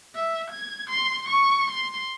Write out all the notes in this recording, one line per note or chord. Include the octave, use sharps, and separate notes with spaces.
E5
G#6
C6
C#6
C6